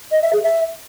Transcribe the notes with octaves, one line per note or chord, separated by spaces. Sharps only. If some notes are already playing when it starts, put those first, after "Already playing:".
D#5
E5
G#4
E5